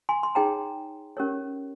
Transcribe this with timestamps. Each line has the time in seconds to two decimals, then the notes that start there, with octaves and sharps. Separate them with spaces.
0.09 G#5 C6
0.23 C6
0.35 D#4 G#4 C#5 G5 A#5
1.17 C#4 G4 A#4 C#5